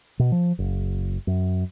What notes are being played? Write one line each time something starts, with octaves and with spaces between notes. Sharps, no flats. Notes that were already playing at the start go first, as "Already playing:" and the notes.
B2
F3
F#1
F#2